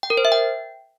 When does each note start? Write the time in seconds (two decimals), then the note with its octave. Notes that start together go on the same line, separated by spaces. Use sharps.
0.03 G5
0.10 A#4
0.17 C5
0.25 E5
0.32 G5